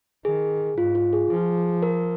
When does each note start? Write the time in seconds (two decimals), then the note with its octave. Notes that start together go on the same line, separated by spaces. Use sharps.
0.25 D#3 G#4
0.78 G#2 F4
0.95 F4
1.13 G#4
1.30 F3 G#4
1.83 A#4